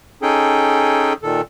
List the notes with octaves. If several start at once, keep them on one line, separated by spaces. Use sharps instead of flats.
C#4 D#4 G#4 A4 G5
A#2 D#3 A4